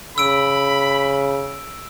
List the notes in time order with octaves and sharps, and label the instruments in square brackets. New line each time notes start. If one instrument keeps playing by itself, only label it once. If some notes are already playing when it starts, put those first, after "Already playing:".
[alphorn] C#3 [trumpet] B5 [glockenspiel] E6 D7